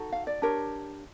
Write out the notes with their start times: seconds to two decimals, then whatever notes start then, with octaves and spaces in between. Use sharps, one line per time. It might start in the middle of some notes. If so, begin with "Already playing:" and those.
Already playing: D#4 F#4 A4
0.12 F5
0.27 D5
0.42 D4 G4 A#4 C#5